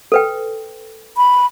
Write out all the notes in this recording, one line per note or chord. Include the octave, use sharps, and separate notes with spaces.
A4 B4 G5
B5